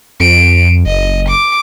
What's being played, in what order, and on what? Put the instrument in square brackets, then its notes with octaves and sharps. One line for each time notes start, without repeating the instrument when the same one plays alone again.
[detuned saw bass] F2 [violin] D7
[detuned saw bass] F#1 [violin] D#5
[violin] D6